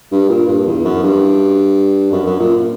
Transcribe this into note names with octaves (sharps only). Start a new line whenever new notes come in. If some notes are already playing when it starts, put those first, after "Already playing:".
G2
A#2
G2
E2
F#2
G2
F#2
F#2
A#2